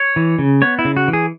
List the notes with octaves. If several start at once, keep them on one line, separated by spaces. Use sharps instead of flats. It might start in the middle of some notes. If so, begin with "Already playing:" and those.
Already playing: C#5
E3
C#3
B3 C#5
E4
C#3
F#4
E3
G#4